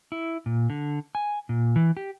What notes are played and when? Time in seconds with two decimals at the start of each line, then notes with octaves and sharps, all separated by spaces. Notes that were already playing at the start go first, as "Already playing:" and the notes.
0.12 E4
0.46 A#2
0.70 D3
1.15 G#5
1.49 A#2
1.76 E3
1.97 G4